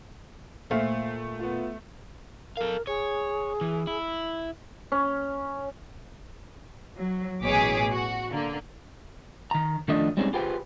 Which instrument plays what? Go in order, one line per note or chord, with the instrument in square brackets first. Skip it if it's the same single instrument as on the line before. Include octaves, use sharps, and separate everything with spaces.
[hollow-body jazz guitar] A#2 [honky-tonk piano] A3 [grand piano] C5 E5 F5
[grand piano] B3 F4
[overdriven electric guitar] A4 F5 [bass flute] A#4
[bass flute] G#4 [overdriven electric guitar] C#5
[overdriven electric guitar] E3
E4
[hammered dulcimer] C#4
[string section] F#3
A1 B2 G#4 C#5 D6 B6
F#4
D3 A#3
[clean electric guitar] D#3 A#5
D#3 F3 A3 D4 D#5
G3 G#3 C4 C#4 D#4 G#4
F4 G4 G#4 B4 C5 G5